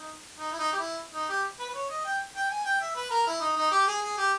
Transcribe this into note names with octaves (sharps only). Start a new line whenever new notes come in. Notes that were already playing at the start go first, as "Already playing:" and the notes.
Already playing: D#4
D#4
E4
D#4
G4
E4
D#4
G4
B4
B4
C#5
D#5
G5
G5
G#5
G5
E5
B4
A#4
E4
D#4
D#4
G4
G#4
G#4
G4